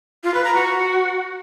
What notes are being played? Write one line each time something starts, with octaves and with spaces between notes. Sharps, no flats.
F4
B4
A#5
F#4